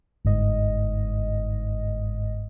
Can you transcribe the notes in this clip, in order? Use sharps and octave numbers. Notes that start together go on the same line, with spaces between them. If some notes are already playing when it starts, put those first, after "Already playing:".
G1 G#2 D#5